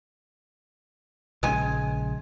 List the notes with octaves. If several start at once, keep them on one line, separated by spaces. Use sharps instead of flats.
A#1 C#3 G#3 G#5